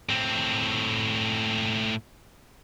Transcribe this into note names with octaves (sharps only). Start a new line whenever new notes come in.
A2 C4